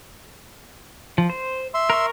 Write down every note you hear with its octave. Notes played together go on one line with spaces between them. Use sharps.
F3
C5
E5 C6
A#4 C#6